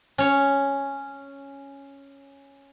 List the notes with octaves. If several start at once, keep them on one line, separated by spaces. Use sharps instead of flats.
C#4 C#5